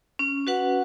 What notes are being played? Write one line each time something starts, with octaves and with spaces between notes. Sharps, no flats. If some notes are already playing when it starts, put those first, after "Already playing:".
C#4
F#4 B4 F#5